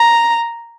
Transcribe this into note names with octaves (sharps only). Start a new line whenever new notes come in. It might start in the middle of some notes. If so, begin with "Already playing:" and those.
Already playing: A#5